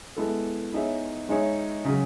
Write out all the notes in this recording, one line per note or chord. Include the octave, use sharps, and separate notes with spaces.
G#3 B3 E4 A4
B3 D#4 G#4 C#5 E5
G#3 D#4 G#4 C#5 E5
C#3 F#3 C#4 G#4